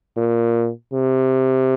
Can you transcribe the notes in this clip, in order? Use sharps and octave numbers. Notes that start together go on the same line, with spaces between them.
A#2
C3